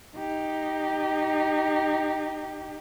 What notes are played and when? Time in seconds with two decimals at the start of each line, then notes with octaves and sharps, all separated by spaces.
0.17 D#4 G4